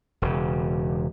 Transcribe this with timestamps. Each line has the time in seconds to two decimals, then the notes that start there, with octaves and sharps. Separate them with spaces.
0.22 E1 C#3